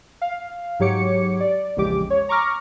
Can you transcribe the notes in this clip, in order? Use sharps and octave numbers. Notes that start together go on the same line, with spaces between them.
F5
G#2 F#3 G4 C#5 D6 C#7
D5
A#1 E2 C#3 G#3 G4 D6
C#5
A#5 C#6 D6 F6 A#6